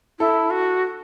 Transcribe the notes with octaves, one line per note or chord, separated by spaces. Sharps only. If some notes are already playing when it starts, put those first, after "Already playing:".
E4 A4
F#4